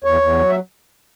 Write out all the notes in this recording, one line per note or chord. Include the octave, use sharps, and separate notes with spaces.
E2 C#5
E2
F#3
E5